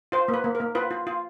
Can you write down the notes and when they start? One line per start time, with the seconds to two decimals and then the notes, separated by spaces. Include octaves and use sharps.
0.12 F4 C5
0.28 A#3
0.34 B4
0.44 A#3
0.55 A#4
0.60 A#3
0.75 F4 B4
0.91 F4
1.07 F4